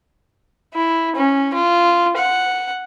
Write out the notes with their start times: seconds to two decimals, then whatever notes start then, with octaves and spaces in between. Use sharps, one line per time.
0.74 E4
1.16 C#4
1.54 F4
2.17 F#5